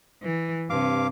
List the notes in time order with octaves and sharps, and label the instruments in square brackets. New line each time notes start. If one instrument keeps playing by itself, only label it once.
[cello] E3
[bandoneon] G2 F5 D6 [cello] C3